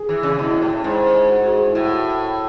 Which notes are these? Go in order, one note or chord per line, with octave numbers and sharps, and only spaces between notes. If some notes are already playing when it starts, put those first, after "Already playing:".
Already playing: G#4
E3
C#3
B2 E4
A2
G#2
F#4
G#4
E4
A2 F#4